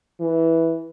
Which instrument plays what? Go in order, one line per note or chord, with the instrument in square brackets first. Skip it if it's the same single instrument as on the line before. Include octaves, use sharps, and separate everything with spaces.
[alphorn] E3